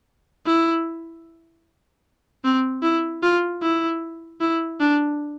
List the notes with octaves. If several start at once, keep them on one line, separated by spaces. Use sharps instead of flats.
E4
C4
E4
F4
E4
E4
D4